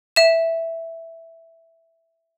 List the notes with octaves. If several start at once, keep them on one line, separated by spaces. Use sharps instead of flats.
E5 E7